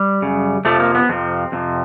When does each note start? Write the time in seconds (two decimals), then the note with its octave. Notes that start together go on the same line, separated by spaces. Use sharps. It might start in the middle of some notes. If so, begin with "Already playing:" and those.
Already playing: G3
0.22 F#2 C#3
0.65 F2 C3 F3 A3
0.80 A#3
0.95 B3
1.09 F2 C3 F3 C4
1.52 F2 C3 F3